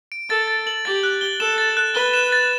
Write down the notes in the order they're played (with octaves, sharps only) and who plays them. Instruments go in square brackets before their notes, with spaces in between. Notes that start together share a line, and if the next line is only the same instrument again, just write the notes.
[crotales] D7
[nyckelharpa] A4 [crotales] A6
[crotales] A6
F#7
[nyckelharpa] G4 [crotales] A6
[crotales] F#6
G7
[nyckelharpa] A4 [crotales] E7
[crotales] A6
F#6
[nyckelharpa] B4 [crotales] G7
[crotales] E7
A6